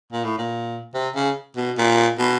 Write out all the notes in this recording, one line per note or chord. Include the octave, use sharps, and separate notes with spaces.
A#2
A2
A#2
C3
C#3
B2
A#2
B2